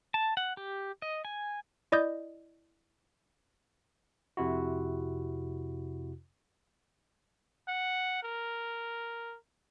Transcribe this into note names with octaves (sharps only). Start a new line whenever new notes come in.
A5
F#5
G4
D#5
G#5
E4 D5 D#5 D#6 G6
F2 C3 E4 F#4
F#5
A#4